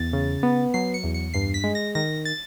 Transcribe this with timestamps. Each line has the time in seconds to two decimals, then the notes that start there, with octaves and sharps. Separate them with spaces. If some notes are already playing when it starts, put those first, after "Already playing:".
Already playing: E2 A6
0.13 C#3
0.43 B3
0.74 F#3 C7
0.94 C#7
1.04 E2
1.14 C#7
1.34 G2 C7
1.54 B6
1.64 G#3
1.75 A#6
1.95 D#3 A#6
2.25 A6